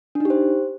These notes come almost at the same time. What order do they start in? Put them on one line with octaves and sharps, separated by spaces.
D4 D#4 G4 C5